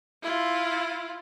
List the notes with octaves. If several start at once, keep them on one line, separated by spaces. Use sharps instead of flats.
E4 F4